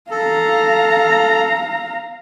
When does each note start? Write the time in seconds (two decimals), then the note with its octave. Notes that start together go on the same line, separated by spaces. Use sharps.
0.11 A4 F5 A#5